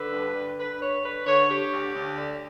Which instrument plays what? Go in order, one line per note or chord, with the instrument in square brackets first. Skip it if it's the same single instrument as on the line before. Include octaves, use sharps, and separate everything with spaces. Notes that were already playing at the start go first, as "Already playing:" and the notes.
Already playing: [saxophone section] D3 B4
G2
D3
D3 B4
G2 C#5
D3 B4
D3 C#5
D3 G4
D2
D2
D3